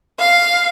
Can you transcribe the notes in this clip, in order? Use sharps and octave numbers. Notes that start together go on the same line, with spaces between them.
F5